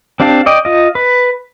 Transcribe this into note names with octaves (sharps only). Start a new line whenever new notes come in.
C4 D4 G4 F5 A5
D5 D#5 G5
F4 D#5
B4